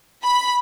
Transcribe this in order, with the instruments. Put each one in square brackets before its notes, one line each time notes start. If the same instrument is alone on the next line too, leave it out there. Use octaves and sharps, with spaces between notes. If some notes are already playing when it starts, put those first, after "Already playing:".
[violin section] B5